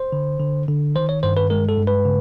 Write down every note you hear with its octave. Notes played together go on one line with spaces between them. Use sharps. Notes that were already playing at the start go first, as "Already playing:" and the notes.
Already playing: C5
D3
D3
D3
D#3 C5
C#5
G2 C5
B4
G#3 A#4
A4
G2
B4
C#3